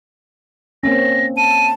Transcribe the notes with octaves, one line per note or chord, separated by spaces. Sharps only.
A#3 C4 C#4 A#6
A5 D#7